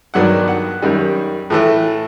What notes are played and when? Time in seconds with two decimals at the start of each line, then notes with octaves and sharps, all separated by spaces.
0.14 G2 D#3 F#3 B3 D4 F#5
0.48 F#5
0.82 F#2 D#3 G3
1.50 A2 E3 A3